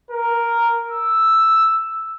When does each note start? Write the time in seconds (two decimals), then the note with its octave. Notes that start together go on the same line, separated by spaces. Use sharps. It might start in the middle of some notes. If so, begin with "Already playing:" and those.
0.11 A#4
0.91 E6